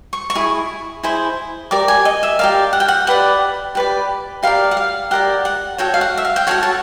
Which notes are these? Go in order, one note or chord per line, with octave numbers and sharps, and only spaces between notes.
C#6
C#6
E4 G#4
E4 G#4 C5
G4 A#4 D5 D6
G#5
D#5
E5
G4 A#4 D5 F5
F#5
G5
F#5
G4 B4 D5 F#5
G4 B4 D5
G4 A#4 D5 F5
F#5
F5
G4 A#4 D5 F#5
F#5
F#4 A4 C#5 G5
F5
F#5
E5
F5
G5
F#4 A4 C#5 F#5
A5